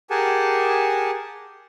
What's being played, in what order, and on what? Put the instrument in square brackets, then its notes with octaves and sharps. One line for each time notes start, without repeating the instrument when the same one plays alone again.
[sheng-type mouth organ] G4 G#4 A#4 F#5 G#5 A5